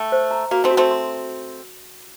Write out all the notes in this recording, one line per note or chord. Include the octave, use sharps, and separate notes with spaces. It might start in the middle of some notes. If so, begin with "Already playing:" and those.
Already playing: A3 G5
C5
A#5
A#3 F#4
A3 C4
F#4
A3 C4
C6